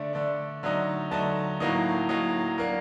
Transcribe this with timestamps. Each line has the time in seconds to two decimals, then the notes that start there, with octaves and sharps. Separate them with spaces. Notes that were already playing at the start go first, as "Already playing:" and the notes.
Already playing: D3 A3 D4
0.13 D3 A3 D4
0.63 D3 F#3 A3 D#4
1.11 D3 F#3 A3 D#4 A5
1.60 A2 F#3 A#3 D#4
2.09 A2 F#3 A#3 D#4
2.58 F#3 A#3 D4 A#4